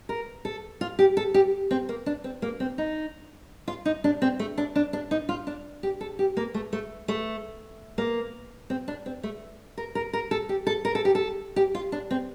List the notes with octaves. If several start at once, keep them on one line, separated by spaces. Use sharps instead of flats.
A#4
A4
F4
G4
A4
G4
C4
A#3
D4
C4
A#3
C4
D#4
F4
D#4
D4
C4
A3
D4
D4
D4
D#4
F4
D4
G4
A4
G4
A#3
A3
A3
A3
A#3
C4
D4
C4
A3
A#4
A#4
A#4
A4
G4
A4
A#4
A4
G4
A4
G4
F4
D4
C4